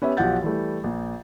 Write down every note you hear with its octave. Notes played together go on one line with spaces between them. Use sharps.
B3 C#4 G4 E5
B1 F3 G4 F#5 G6 A6
E3 G3 A3
A#1